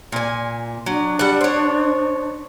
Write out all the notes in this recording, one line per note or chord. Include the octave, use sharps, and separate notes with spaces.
A#2 G#5
F#3 D4
G3 F#5
C5 C#5